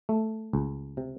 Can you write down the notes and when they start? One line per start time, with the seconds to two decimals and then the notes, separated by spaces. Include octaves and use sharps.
0.09 A3
0.53 C#2
0.97 C3